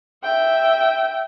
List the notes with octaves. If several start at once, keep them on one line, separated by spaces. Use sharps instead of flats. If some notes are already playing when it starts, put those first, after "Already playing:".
E5 G5